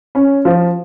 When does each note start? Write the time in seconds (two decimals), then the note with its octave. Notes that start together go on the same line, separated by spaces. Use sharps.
0.15 C#4
0.45 F3